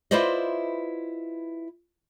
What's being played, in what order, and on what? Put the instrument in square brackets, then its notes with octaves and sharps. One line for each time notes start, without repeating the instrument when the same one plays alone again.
[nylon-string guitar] E4 F4 B4 C5 D5 D#5